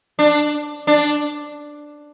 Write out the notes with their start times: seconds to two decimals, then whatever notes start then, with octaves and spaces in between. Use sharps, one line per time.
0.19 D4
0.87 D4